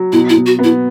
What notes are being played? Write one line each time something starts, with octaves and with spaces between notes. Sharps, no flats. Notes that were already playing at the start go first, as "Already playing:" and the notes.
Already playing: F#3
B2 E4
E4
B2
F#4
B3
E4